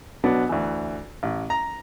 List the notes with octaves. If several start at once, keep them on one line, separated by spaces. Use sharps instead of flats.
B2 F#3 B3 D4
D2 E3
A1
A#5